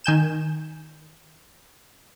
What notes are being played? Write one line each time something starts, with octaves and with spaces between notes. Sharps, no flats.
D#3 G#5 G6 E7